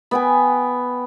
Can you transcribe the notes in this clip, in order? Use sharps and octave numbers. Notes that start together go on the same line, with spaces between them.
B3 G5 G#5